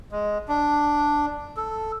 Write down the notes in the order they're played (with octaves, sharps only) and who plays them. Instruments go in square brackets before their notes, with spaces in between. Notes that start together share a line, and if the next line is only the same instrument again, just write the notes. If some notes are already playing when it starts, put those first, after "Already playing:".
[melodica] G#3
D4
A4